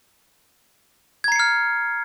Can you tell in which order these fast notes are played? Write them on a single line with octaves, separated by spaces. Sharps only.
G#6 A#5 C7 C#7 F6